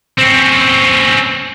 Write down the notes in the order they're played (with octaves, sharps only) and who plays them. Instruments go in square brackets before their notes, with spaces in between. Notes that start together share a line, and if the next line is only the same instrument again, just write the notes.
[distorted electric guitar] C4 C#4